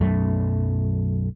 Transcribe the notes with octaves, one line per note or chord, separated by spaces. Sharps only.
B1 F#2 A3